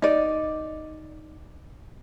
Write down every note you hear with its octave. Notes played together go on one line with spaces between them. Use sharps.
D#4 D5